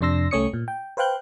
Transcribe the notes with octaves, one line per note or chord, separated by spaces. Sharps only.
F2 C3 D4 C6 E6 A#6
C2 A3 C#4 C#5 D#6 C#7
A#2
G5
B4 C5 F5 G5 F#6 G6